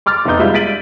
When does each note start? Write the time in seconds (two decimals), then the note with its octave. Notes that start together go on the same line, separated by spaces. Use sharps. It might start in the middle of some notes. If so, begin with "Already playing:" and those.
0.06 C6 D6 F6 A6
0.25 F1 B3 D#4 G6
0.39 G3 G#3 F4 E5
0.54 A6 B6 D7 D#7 F#7